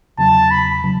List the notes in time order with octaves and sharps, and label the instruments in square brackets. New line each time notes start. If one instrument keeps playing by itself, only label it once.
[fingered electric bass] E2 C#3 F#3 [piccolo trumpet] A5
[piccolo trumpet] B5
[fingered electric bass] C#3 F#3